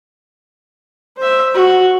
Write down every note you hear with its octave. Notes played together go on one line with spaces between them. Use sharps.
C5 E5
F#4